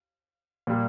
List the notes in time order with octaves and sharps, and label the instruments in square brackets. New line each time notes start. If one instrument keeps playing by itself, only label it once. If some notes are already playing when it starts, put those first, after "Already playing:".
[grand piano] A#2 G3 A#3